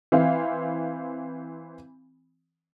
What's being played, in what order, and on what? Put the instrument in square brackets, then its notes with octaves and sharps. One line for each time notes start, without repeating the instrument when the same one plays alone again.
[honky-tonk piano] E3 C4 F5